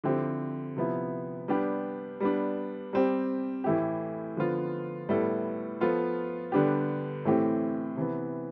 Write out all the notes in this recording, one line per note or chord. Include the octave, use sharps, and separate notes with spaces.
D3 F3 C4 E4 G4
C3 F3 B3 E4
G3 B3 D4 G4
G3 B3 D4
G3 C4 G4
A2 E3 A3 E4 G4
D3 F3 B3 F4
A2 G3 B3 E4 A4
F3 B3 F4 A4
D3 G3 B3 D4 G4
A2 E3 A3 C4 G4
C3 E3 B3